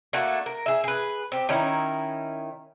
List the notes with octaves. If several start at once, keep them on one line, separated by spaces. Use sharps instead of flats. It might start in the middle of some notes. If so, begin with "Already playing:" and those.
A3 A#3 D4 F#4
A#4
G#4 E5
G#4 B4
C4 G4
D#3 C#4 D#4 E4